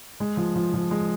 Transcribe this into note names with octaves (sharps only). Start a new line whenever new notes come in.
G#3
F3
F3
F3
G#3